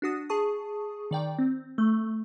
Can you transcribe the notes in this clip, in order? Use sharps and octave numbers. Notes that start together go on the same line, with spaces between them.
D4 F#4 D#6
G#4 A5 C#6 D#6
D#3 D5 G5
C4
A3